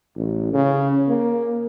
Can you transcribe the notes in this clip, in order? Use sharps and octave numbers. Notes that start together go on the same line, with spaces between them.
A1
C#3
A#3